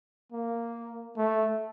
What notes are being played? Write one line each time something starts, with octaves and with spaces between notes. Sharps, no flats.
A#3
A3